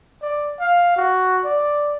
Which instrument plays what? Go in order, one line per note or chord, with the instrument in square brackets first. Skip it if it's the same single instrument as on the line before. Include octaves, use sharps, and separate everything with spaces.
[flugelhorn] D5
F5
F#4
D5